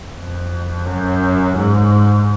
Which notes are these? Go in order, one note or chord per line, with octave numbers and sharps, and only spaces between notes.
F2
F#2
G#2